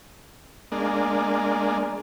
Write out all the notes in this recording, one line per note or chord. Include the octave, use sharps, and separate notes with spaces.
G#3 A#3 D4